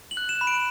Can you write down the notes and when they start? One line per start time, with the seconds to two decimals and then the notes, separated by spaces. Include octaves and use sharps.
0.11 F#7
0.17 F#6
0.29 E7
0.41 B5
0.47 D7